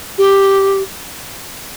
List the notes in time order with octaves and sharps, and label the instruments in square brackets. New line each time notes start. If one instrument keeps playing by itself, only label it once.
[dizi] G4